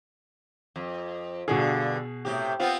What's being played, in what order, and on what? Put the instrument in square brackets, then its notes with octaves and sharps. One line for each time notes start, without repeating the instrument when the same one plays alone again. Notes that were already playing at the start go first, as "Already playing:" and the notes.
[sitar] F2
[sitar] G2 D3 [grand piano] B2 G#4
[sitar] A2 C3 G4
B3 C4 F4